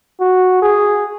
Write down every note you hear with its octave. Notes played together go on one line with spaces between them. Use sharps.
F#4
G#4